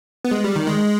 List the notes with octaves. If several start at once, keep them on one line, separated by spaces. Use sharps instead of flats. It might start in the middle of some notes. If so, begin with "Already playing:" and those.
B3
G#3
G3
D#3
G#3